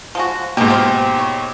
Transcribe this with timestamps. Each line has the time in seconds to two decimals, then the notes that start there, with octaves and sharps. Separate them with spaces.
0.15 F3 G#3 F#4
0.57 G#2 B2 G#3 A#3 D#4 G4
0.70 F3 F4 C5
1.19 C#5